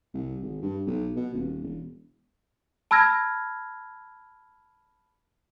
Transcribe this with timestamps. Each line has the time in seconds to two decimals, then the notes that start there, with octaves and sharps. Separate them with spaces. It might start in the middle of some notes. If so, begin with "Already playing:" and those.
0.14 C2
0.42 G#1
0.62 G2
0.87 B1
1.16 B2
1.34 D#1
1.62 E1
2.91 A5 B5 E6 F6 G#6 A#6